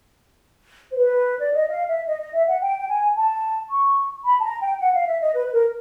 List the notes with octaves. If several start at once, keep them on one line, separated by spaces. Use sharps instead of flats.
C5
B4
D5
D#5
F5
E5
D#5
D#5
E5
F#5
G5
G5
G#5
A5
C#6
B5
A5
A#5
G5
F#5
F5
E5
D#5
B4
B4
A#4